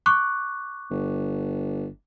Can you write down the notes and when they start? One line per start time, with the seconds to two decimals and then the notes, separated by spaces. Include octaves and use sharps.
0.06 C#6 D6 F#6
0.91 G1